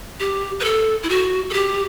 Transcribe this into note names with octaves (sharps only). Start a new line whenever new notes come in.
G4
B4
A4
E4
F#4
A4
G4